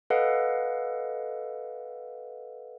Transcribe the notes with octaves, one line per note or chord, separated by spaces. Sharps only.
A4 B4 D#5 F5 F#5